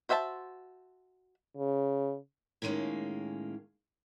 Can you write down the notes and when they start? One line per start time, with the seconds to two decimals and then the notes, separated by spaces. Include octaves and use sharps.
0.09 F#4 C5 E5 G#5 A5
1.57 C#3
2.62 A2 D#3 G#3 A#3 C#4